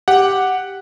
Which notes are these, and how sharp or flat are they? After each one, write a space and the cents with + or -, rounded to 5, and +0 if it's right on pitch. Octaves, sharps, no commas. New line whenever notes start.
G4 +0 F#5 +0